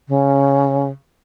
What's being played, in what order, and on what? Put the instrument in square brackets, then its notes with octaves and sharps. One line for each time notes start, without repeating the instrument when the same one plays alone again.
[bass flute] C#3